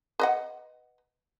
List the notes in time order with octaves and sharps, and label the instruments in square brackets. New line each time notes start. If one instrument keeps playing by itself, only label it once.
[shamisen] B4 D#5 F#5